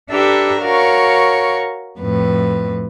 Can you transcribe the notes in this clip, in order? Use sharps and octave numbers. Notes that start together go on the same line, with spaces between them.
D4 G4 A4 B4 E5 A#5
F#4 A#4 C#5 F5 C#6
F2 A2 B4